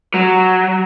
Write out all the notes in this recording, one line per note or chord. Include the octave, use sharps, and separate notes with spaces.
F#3